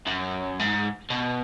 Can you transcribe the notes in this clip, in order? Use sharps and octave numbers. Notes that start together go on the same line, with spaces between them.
F#2
G#2
B2